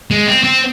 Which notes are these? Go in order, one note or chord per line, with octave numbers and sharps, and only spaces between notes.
G#3
C4
C4